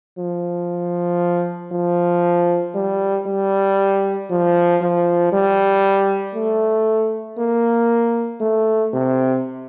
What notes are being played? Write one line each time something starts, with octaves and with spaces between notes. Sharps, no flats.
F3
F3
G3
G3
F3
F3
G3
A3
A#3
A3
C3